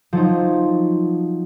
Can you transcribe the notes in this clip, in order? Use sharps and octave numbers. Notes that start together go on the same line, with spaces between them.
F3 F#3 D#4